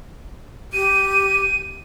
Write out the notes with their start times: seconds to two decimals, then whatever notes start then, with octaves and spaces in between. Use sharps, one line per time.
0.73 G4 D#7